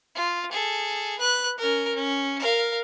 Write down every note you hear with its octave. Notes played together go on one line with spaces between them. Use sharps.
F4
G#4 A4
B4 F#6
C#4 A#4
C#4
A#4 F5